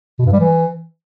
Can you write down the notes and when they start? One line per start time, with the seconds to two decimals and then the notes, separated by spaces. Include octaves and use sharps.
0.19 B2
0.26 G2
0.33 G3
0.40 E3